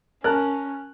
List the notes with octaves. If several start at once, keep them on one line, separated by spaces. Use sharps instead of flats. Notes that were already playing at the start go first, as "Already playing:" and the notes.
C#4 A#4 A5 F#6